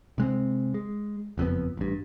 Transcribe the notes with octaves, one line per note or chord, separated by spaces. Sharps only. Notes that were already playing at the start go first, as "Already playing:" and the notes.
C3 G#3 C4
G#3
F#1 F2 C3 B3
A1 G2